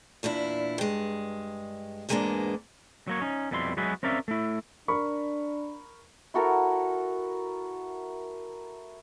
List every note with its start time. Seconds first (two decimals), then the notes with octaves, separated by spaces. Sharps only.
0.23 E2 A#2 D4 E4
0.78 G2 G#3
2.09 E2 G#2 G#3 A#3 B3 D4
3.07 F#3 A#3 C#5
3.21 C#4 D#4
3.51 F2 B2 G3 E4 C6
3.77 F#3 G#3 B3 E4 F#4 G#4
4.03 C4 C#4 A#4 D5 E5 F5
4.28 A3 E4
4.88 D4 A#4 B5 C#6
6.34 E4 F#4 A4 A#4